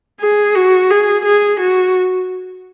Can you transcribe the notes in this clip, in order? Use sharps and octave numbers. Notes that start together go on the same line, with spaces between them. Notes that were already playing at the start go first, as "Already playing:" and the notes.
G#4
F#4
G#4
G#4
F#4